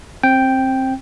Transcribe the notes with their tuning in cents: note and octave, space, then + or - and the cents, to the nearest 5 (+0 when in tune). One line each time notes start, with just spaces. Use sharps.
C4 +20 G5 +0